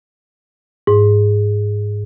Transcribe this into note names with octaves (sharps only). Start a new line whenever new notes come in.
G#2